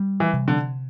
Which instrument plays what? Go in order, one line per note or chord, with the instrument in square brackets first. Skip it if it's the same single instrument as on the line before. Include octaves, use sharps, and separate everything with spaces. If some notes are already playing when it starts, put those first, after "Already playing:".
Already playing: [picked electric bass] G3
[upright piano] E3
[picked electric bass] C3
[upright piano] D3